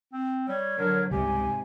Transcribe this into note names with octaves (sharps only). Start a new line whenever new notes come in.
C4
G3 C#5
D3 F#3 A#4
C#2 G#2 C3 G3 G4 G#5